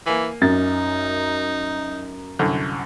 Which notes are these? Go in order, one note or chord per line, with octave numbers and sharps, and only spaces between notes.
E3 A#3 G#5
F#2 D#4 A6
C2 F#2 D3